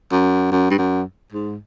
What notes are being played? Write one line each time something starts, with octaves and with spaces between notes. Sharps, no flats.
F#2
F#2
G2
F#2
G#2